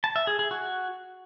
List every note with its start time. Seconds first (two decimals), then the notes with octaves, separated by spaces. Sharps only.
0.04 A5
0.16 E5
0.27 G#4
0.39 G#4
0.51 F#4